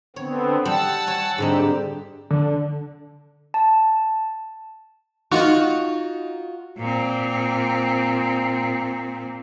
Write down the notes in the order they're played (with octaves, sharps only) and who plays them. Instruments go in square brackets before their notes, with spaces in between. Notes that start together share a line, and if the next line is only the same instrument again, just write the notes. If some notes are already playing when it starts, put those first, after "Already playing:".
[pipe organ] D3 B3 C4 [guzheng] C#5
[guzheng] G3 [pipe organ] F#5 A5 E6
[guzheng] C#5 G#5
[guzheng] G#2 D3 D#4 [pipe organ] G3 C4 G4
[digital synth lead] D3
[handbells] A5
[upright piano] D#4 [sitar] F4 F#4
[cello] A#2 C4